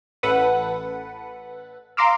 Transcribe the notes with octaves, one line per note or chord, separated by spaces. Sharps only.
A1 A4 B4 F#5
F5 A#5 C6 D6 E6 F6